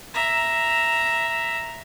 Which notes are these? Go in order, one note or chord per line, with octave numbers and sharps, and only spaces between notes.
E5 A#5